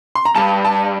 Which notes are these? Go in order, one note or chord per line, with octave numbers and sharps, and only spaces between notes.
C6
A#5
G2 A5
A5